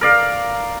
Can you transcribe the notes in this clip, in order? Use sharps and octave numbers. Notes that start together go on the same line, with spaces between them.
A#4 D5 F5